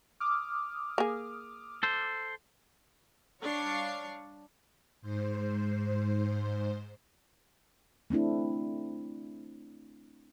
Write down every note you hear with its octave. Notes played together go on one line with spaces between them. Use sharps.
D6 D#6 F6
A#3 G#4
A4 C5
G3 D4 C#5 F5 C#6 C7
G#2 C5
A3 C4 D4 E4